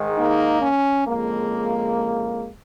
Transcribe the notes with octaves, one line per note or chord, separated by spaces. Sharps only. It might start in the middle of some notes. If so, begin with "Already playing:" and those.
Already playing: G#2 D#3 G#3
A#3 D#4
C#4
F2 C#3 G#3 A#3